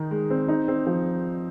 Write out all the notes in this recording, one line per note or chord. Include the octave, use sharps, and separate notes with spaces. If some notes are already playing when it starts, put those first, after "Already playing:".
Already playing: D#3 D#4
G#3
C4
D#4
C4
F3